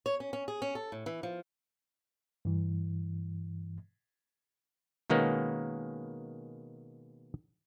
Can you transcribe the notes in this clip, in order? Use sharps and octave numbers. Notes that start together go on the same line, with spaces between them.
C#5
C#4
C#4
G#4
C#4
A4
A2
E3
F3
G2 E3
B2 D#3 G#3 A#3 B3 C#4